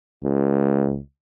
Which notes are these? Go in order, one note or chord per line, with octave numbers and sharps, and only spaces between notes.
C#2